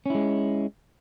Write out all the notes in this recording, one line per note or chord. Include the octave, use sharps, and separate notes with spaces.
G#3 C#4 E4